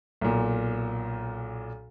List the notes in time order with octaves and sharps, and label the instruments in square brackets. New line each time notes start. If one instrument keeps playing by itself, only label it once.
[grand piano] B1 A#2